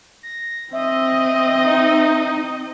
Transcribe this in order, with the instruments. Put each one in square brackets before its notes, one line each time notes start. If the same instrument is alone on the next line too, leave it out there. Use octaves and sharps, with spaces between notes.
[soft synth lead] A#6
[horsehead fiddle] C4 D#5 [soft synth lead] E5
[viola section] D#4